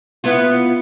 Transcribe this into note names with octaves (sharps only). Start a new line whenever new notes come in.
B3 E4 F4